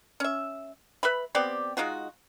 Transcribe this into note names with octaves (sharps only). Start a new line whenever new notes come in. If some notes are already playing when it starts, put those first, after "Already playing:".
C#4 E5
B4 E5 B5
B3 C4 G4 D5
G#3 D#4 F4 F#4